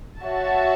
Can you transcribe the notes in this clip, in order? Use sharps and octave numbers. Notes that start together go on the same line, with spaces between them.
F#4 C#5 E5 A5